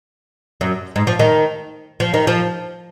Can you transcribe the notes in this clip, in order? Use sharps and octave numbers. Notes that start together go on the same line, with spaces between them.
F#2
G#2
F3
D#3
F3
D#3
F3